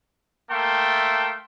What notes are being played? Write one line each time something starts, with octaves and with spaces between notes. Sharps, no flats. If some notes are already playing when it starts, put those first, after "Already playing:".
A3 A#3 E5 G5 A5 C6